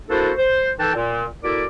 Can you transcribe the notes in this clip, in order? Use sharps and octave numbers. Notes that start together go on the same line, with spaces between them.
A#3 D4 E4 F#4 A4 C5
C5
D#3 E3 A4 A#4 G5 A5
A#2
B2 E4 A4 A#4 D5 D6